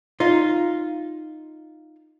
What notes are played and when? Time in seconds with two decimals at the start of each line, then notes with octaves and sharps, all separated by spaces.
0.20 D#4 F4